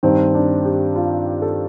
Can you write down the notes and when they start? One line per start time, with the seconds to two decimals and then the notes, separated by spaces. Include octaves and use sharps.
0.03 G2 D#3 C4
0.34 D4
0.65 G4
0.96 F4
1.42 A4